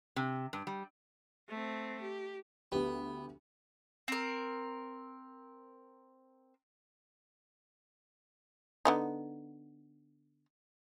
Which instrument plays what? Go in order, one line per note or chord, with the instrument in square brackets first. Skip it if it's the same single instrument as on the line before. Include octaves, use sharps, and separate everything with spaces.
[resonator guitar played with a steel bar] C3
G2
G3
[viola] A3 C4
G4
[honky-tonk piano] D2 G4 [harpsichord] B3
[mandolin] C4 A#4
[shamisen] D3 B3 D#4